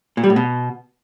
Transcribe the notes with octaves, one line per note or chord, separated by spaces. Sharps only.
A#2
G3
A2
B2